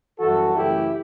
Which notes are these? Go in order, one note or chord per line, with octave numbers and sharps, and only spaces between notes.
F#2 E3 G3 F#4 A4
F#2 C#3 E3 A3 E4 G4